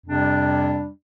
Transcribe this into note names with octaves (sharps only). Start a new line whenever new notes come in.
F2 C3 G3 D4